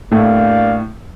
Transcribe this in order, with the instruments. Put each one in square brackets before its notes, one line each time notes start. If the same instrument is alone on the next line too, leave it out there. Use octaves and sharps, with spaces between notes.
[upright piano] A2 A3 [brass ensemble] A#3 D4 G4 D5 F5